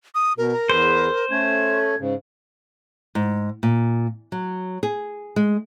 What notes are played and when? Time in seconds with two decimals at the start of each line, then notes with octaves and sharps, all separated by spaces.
0.15 D#6
0.38 B2 A#4
0.54 A#5
0.70 E2 G#4 B4 C5
1.31 A3 C#4 G#6
2.00 G#2 C#3
3.15 G#2
3.63 A#2
4.32 F#3
4.83 G#4
5.36 G#3